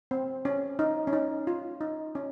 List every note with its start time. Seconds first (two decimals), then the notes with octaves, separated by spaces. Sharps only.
0.11 C4
0.45 C#4
0.79 D#4
1.07 C#4
1.13 D#4
1.47 F4
1.81 D#4
2.15 C#4